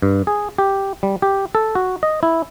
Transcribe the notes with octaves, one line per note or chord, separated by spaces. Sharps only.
G2
G#4
G4
G3
G4
A4
F#4
D#5
E4